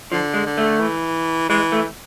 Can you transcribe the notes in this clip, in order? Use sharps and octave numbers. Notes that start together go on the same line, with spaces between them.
D3 F3
G#3
D3
A3
E3
E3 G#3
A3